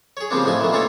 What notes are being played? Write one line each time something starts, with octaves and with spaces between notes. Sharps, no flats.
G#4 C#5
C#3 F3 G3 A#3 C4 D4
A1 F3 A3 D#4 G#5
A#2 D#3 E3 A3
A#2 A#3 D#4 F4 A4 C#5